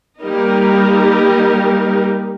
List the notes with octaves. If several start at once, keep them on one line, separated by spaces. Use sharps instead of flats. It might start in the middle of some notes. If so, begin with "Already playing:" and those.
G3 A#3 D#4 G4 A#4